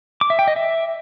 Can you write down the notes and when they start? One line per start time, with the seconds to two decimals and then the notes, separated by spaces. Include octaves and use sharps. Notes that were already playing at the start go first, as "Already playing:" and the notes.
0.21 D6
0.30 E5
0.39 G5
0.48 D#5
0.56 E5